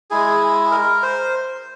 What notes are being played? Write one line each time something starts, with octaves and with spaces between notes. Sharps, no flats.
G#3 E4 G#4
A#4
C5